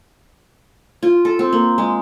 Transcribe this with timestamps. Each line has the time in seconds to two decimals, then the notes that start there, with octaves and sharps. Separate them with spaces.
1.03 F4
1.25 A4
1.39 C4
1.53 A#3
1.78 G#3